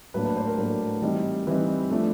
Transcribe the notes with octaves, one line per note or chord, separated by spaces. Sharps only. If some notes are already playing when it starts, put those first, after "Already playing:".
A2 F#3 A#3 D4 B4
B4
C5
A#4
A2 F#3 A#3 D4
E3 G3 C4 D#4
E3 G3 C4 D#4 B4
F3 A3 D4